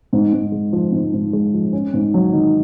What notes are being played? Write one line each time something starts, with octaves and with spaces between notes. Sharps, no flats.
G#2
G#2
G#3
F3
G#2
G#2
G#3
F3
C#4
G#2
F#3
D#3